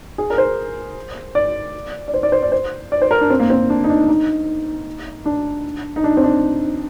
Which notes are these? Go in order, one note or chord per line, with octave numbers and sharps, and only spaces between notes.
G#4
A#4
C5
D5
D5
C5
D5
C5
D5
C5
D5
C5
A#4
D4
C4
A#3
C4
D4
D#4
D4
D#4
D4
D#4
D4
C4
D4